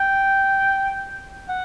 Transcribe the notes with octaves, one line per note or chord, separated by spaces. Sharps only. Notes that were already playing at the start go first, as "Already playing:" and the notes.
Already playing: G5
F#5